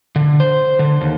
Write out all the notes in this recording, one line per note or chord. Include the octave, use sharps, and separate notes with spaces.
D3
C5
D3
D#2